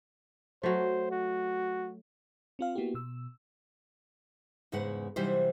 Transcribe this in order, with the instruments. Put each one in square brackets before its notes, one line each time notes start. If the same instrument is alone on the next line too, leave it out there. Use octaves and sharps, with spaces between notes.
[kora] F#3 A3 [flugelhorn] C5
[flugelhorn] F#4
[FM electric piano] C4 F4 F5
A#3 B3 E4 F#4 G4
B2 E6
[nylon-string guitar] E2 G#2 C#3 G#3 B4 F#5
C3 E3 F#3 G3 D#4 C5